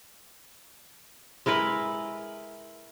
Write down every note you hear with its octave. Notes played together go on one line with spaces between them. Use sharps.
G#3 E4 A#4 B4